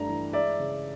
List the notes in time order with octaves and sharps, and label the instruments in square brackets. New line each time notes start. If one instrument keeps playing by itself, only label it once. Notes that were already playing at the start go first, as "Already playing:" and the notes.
Already playing: [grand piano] G2 G3 A3 A#5
E3
G#3 D5 E5
C#3